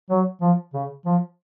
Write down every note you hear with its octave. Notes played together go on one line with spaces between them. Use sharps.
F#3
F3
C#3
F3